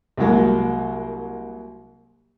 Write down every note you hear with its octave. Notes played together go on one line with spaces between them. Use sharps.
C2 F#3 G#3 A#3